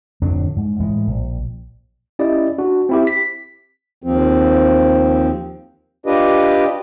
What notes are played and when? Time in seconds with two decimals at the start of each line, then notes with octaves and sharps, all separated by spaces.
0.22 D1 F2 F#3 D4
0.56 G#2
0.80 A2 E3 G#3
1.07 A#1
2.19 C#4 E4 G4 D5 D#5
2.59 D4 F#4
2.89 C4 E4 G4
3.07 B6
4.03 D#2 F3 C4
6.06 D4 F4 G4 B4 D#5